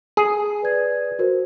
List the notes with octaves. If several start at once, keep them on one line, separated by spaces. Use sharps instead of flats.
G#4
B4 D5 G#6
F#4 A#4 C5